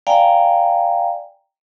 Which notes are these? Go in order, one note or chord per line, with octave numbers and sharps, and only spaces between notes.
D5 F5 G5 G#5 A#5